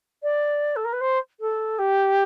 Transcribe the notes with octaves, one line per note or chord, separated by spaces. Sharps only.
D5
A4
A#4
B4
C5
A4
G4